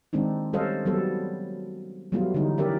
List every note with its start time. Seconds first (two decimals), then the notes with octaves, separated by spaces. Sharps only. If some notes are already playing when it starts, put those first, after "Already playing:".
0.13 D#3 G#3 C4 D4 D#4
0.53 G3 C#4 A4 C5 D#5 F5
0.85 F#3 G3 B3 A4
2.12 F#3 G3 A3 B3 F4
2.34 D3 E3 G3 D#4
2.58 E3 C#4 G4 A#4 D5 E5